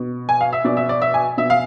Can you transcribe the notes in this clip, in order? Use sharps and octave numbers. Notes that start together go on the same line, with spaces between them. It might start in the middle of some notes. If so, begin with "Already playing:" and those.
Already playing: B2
G#5
F5
E5
B2 D5
E5
D5
E5
G#5
B2 E5
F5